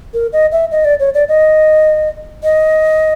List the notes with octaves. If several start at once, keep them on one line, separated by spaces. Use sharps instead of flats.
A#4
D#5
E5
D#5
D5
C#5
D5
D#5
D#5